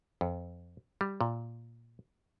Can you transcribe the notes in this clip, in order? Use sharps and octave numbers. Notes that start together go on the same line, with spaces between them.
F2
G3
A#2